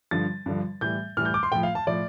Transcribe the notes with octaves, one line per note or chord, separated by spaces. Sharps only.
G2 D3 F3 A6
G2 D3 F3
A2 E3 G3 G6
A2 E3 G3 F6
G6
D6
C6
A2 F3 G5
F5
A5
A2 F3 D5